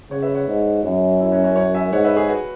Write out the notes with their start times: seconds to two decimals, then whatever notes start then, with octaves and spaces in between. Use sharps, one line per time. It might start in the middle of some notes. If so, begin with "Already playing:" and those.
0.11 C#3 C#5 F#5
0.22 B4 E5
0.35 C#5 F#5
0.47 G#2
0.84 F#2
1.20 E4
1.32 C#4 F#4
1.44 C#4 F#4
1.56 C#5 F#5
1.74 E5 G#5
1.92 G#2 C#5 F#5
2.04 B4 E5
2.16 G#4 C#5
2.29 F#4 B4